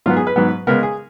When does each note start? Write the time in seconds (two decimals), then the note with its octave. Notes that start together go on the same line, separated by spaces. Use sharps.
0.06 G#2 F#3 B3 F4
0.16 G#4
0.27 B4
0.36 G#2 F#3 B3
0.67 C#3 G#3 B3 A#4
0.83 G#4